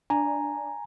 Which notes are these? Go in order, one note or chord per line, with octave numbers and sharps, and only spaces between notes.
D4 G#5 A#5